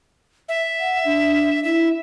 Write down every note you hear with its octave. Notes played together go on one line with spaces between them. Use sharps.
E5
F#5
D4
E4 E5